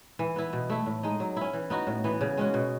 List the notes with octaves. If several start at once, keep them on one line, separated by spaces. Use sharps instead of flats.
E3
B3 E4
B2
A3 E4
A2
G#3 D#4
F#3
C#4 E4
E3
B3 D#4 F#4
A2
E3 B3
C#3
G#3 C#4 F#4
B2